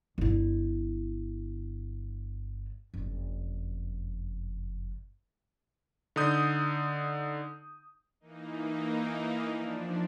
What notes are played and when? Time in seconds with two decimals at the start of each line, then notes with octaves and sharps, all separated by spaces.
0.18 G1 E4
2.94 F#1 F2
6.16 D3 D#4 D#6 G6
8.20 E3 A#3 D#4
9.52 F3 D4